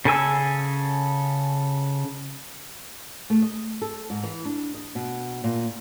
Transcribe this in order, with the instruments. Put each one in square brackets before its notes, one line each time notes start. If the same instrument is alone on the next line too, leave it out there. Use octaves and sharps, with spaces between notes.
[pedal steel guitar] C#3 A4 G#5 E6
[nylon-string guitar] A3
D#5
A4
G#2
E3
D4
D#5
B2
A#2